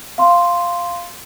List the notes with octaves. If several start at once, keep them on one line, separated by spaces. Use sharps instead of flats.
F5 C6